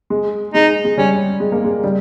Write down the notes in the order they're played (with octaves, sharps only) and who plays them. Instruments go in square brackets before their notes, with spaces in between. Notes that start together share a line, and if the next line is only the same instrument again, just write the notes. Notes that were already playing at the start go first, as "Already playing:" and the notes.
[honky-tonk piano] G#3
[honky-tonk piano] G#3 [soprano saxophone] D#4
[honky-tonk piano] G#3
[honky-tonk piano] G3 [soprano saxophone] C#4
[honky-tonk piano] G#3
A#3
G#3
G3